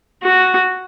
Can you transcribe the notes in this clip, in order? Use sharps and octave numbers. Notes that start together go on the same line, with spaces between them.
F#4